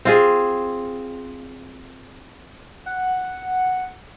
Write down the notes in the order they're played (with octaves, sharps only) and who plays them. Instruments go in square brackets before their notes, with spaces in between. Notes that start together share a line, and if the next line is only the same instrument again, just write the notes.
[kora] C4 F4 G#4
[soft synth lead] F#5